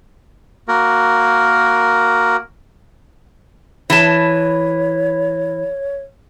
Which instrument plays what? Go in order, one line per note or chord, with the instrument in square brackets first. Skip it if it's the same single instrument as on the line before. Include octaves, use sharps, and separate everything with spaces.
[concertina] A#3 F#4 A#4
[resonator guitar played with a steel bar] E3 A5 [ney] C#5